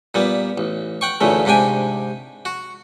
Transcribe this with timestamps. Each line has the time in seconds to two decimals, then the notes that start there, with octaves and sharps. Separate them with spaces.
0.14 A#2 G3 B3
0.58 A1
1.01 F#5 G5 C#6
1.21 A1 D2 A#2 C#3 A3
1.45 G#2 C3 D4 G5 G#5
2.45 F#4